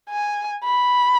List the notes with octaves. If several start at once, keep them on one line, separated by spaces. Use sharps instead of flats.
G#5
B5